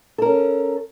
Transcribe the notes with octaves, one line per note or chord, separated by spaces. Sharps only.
C#4 A4 A#4